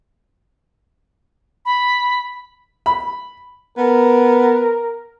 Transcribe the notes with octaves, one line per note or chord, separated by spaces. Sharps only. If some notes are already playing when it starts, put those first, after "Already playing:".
B5
B5
B3 A#4